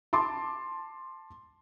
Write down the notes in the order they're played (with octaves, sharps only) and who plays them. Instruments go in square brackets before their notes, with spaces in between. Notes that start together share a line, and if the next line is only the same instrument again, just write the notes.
[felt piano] A5 C6 D6